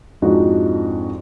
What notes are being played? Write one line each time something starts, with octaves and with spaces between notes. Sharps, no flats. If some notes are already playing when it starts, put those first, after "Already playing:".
F2 G#2 D4 D#4 F#4